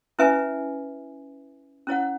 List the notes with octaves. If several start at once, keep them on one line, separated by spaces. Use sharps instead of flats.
C#4 E4 B4 E5 G#5
C#4 E4 C#5 F#5